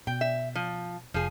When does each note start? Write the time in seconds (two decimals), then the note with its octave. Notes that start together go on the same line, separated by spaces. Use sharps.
0.07 B2 G5
0.21 E5
0.55 F3
1.14 F1 F3 G#4